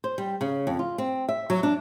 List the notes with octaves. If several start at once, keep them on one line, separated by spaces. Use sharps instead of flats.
C5
G3
C#3
F2
F4
C4
E5
F#3
D4